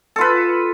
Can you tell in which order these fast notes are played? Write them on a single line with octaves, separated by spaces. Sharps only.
A4 F4 B4